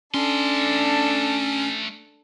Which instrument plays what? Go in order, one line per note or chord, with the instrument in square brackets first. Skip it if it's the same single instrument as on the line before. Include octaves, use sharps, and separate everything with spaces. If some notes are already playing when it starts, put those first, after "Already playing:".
[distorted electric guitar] A3 C6 [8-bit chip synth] C#4 [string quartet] D4 A4